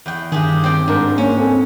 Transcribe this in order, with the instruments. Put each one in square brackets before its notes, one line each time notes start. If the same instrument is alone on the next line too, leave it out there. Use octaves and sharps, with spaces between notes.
[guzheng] E2 G5
[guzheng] G2 G4 G#4 [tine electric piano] D#3
[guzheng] C4 D5 G5
[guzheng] G#2 [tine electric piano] D4 A#4
[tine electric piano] A#3 [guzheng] C#4
[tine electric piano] C4 A4 G#5